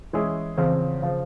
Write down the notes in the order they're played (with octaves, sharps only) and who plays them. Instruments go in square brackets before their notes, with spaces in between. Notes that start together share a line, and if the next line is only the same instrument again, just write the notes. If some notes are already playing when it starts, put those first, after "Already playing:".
[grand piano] E3 G#3 C#4 E4 G#4
E2 C#3 F3 C4
C#3 F3